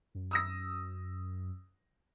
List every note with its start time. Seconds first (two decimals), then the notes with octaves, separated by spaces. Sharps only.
0.15 F#2
0.31 D#6 E6 A#6